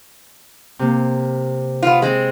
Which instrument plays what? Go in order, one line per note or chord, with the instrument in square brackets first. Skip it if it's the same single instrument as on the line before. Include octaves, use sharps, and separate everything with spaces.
[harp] C3 A#3
[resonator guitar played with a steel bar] B3 F4
G#3 C4